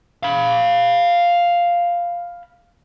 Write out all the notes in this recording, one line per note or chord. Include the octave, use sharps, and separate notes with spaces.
F5 B5